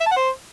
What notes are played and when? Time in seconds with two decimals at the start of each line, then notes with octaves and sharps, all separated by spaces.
0.01 E5
0.06 A5
0.11 F#5
0.16 C5